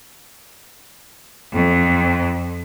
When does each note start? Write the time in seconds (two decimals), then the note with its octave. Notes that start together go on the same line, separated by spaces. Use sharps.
1.53 F2